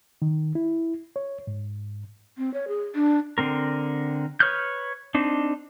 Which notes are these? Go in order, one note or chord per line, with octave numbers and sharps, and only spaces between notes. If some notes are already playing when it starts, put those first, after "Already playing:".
D#3
E4
C#5
G#2
C4
C#5
G#4
D4
D3 C4 A#4
B4 C#5 D#6 F6 G6
C4 D4 D#4